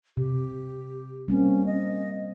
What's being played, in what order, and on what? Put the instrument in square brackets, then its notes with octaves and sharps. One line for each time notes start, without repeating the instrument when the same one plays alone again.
[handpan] C3 [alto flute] G4
[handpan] G3 A#3 C4 [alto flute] C#4
[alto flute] D#5